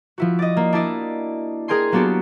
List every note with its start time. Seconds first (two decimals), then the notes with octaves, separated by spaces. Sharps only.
0.18 F3 E4 F#4
0.39 D5 D#5
0.57 A#3
0.73 D4 E4 D5 D#5
1.68 G#4 A#4 G5 G#5 C6
1.92 F#3 A#3 B3 D4 F#4 G4